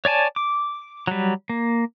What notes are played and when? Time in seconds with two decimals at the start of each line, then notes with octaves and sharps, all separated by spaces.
0.05 C#5 D5 G#5 A5
0.36 D6
1.07 F#3 G3
1.50 A#3